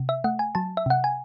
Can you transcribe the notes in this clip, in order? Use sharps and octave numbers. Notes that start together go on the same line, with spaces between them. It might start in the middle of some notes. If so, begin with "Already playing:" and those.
Already playing: C3
E5
A3 F#5
G#5
F#3 A5
E5
C3 F#5
G#5